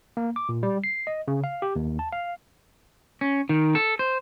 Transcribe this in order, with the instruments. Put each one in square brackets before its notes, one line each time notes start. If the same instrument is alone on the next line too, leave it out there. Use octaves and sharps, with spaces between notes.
[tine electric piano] A#3
D6
A#2
G3
C7
D#5
C#3
F5
G4
D#2
A5
F5
[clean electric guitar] C#4
D#3
A4
C5